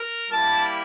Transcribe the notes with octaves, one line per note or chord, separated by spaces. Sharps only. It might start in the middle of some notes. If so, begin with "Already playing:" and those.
Already playing: A#4
G3 A#3 E4 G4 A5